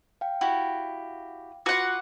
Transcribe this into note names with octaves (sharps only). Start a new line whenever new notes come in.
F5 G5
E4 F#4 G4
F4 F#4 B4 F#5 D6